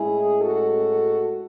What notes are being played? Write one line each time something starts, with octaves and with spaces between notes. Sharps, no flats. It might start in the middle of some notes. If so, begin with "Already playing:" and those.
Already playing: A2 G#3 C#4 E4 G#4
F#4 A4